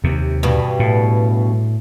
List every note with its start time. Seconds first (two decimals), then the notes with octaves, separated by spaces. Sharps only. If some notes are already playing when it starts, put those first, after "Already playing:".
0.04 D#2 C3
0.43 G2 B2
0.79 A2